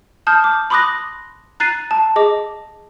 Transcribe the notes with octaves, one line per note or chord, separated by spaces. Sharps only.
A5 D#6 F6 G6
D6
B5 C6 D6 D#6 F#6 A#6
A#5 F#6 A6 C7 D#7
A5
G#4 D#5 D6